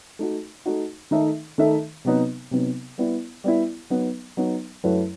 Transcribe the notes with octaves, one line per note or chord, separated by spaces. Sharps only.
A3 D#4 F#4
A3 D#4 F#4
D#3 A3 D#4 A4 E5
D#3 A3 D#4 A4 E5
C3 F#3 B3 D#4
C3 F#3 B3 D#4
G3 B3 E4
G3 B3 E4
F#3 B3 D#4
F#3 B3 D#4
F#2 F#3 A3 E4 B4